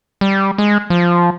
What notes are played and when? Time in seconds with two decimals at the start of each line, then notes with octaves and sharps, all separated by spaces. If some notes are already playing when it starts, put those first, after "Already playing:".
0.21 G3
0.58 G#3
0.90 F3